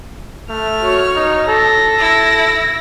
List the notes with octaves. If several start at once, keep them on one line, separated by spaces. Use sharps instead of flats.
A3 F6
F#4 C#5
D#4
A4 A#6
E4